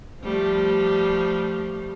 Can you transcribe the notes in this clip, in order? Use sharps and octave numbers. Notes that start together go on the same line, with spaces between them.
F3 G3 A3